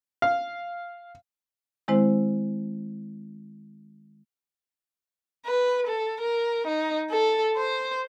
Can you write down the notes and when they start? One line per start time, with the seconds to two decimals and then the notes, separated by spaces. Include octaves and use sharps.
0.22 F5
1.88 D#3 G#3 C4 E4 C5
5.46 B4
5.87 A4
6.20 A#4
6.67 D#4
7.10 A4
7.56 C5